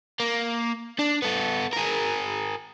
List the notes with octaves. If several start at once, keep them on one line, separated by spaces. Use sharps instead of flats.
A#3
D4
B3 A4
G#4 A#4